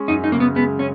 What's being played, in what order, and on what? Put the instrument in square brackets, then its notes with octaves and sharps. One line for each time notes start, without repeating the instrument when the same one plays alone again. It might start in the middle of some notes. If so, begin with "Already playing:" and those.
Already playing: [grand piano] G#3 C#4
[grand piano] F#2 [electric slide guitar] D#4
[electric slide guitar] D#4
[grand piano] C#3 [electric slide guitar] A#3
[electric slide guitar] B3
[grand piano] G#3 [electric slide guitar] B3
[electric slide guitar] C#4